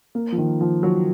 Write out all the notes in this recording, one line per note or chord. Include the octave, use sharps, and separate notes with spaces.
A#3
F3
D#3
F3
F#3